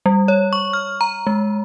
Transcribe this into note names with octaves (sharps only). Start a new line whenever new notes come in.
G3
C#5
C#6
F6
A#5
G#3